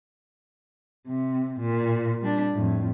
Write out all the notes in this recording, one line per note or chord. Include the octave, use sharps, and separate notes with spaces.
C3
A#2
G3 D4
F2 A2